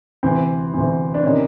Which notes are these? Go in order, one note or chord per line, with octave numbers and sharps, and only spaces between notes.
D2 C3 E3 C4
D2 C3 E3
D4
C3 D#3 C#4